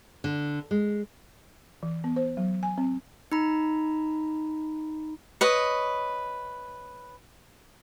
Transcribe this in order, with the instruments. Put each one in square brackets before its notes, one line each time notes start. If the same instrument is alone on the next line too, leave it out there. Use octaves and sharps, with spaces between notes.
[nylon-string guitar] D3
G#3
[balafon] E3
B3
C5
F#3
G#5
C4
[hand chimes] D#4 A#5 B5
[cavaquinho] B4 C#5 D#5